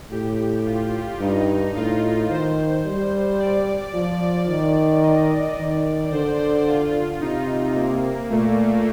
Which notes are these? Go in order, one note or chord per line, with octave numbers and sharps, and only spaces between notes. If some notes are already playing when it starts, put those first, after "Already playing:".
A2 G4
F4
G2 D#4
A2 F4
D#3 C5
G3
D5
F3
D#3
D#5
D#3 D5
D3 C5
F4
C3 D#4
A#3
A#2 A3